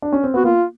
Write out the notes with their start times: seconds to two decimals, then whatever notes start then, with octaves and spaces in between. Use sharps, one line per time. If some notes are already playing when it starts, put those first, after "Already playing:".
0.02 D4
0.13 C#4
0.24 C4
0.34 B3 F#4
0.44 A#3 F4